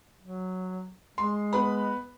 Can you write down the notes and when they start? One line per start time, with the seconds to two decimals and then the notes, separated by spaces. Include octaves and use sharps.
0.23 F#3
1.18 G#3 C6
1.53 B3 B4 B5